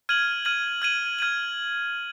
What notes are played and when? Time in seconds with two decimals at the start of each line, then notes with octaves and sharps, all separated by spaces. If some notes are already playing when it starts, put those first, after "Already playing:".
0.09 F6 G#6 D#7 F#7
0.45 F6 G#6 D#7 F#7
0.82 F6 G#6 D#7 F#7
1.19 F6 G#6 D#7 F#7